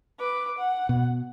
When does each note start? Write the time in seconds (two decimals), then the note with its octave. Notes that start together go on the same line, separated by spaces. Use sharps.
0.19 B4 D6
0.58 F#5
0.89 B2